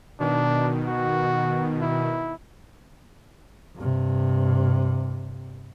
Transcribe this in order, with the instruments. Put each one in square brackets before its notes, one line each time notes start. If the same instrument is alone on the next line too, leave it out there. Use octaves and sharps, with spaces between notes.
[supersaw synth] B2 D#3 [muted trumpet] D4
[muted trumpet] F#4
E4
[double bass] G2 C3